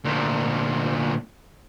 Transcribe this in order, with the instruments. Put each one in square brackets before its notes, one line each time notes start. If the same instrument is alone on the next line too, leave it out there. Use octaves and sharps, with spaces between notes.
[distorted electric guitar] D2 A#2